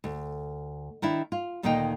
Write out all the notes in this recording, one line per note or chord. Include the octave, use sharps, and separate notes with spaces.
D2
D#3 D4 E4
F4
D2 A#2 D#3 A#3 D#4 G5